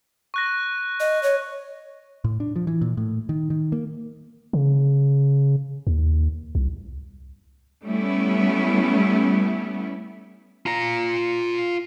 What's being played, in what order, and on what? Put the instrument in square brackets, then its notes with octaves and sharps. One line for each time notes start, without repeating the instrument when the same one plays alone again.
[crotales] C#6 F#6 A#6
[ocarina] D#5
C#5
[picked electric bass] A2
D4
F3
E3
A#2
A2
D#3
D#3
A#3
[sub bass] C#3
D#2
C2
[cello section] G3 A3 B3 C#4 E4
[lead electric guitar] F4 A#5